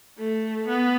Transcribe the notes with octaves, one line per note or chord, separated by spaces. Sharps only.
A3
B3